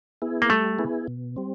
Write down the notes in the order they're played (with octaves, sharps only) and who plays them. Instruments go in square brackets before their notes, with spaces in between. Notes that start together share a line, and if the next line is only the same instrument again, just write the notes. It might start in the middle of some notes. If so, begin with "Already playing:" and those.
[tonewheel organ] B3 E4 G#4
[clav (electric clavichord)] A#3
[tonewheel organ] G3 [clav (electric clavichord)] A3
[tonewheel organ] B3 E4 G#4
B2
G3 C4